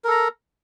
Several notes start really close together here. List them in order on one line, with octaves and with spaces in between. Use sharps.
A#4 A4 A#5